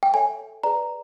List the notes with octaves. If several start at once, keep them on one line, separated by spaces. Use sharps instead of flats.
G5
A4 C#5 E5 G5 G#5
G#4 B4 D5 A#5